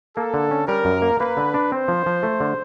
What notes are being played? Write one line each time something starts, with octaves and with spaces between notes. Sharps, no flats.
A#3 A4
D3
C#4
G3 A#4
F#2
A#3
A#3 B4
D3
D4
C4 C5
F3
F3
A3
D3